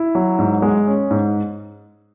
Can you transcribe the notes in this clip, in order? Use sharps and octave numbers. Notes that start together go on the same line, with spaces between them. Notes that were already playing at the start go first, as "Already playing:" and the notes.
Already playing: E4
F#3
G#2
G#3
C#4
G#2